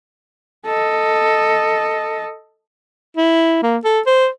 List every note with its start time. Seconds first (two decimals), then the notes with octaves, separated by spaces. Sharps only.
0.65 A4 D#5
3.17 E4
3.63 A#3
3.84 A4
4.06 C5